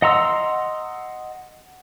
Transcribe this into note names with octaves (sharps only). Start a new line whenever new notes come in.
D#5 F#5 A#5 C6 E6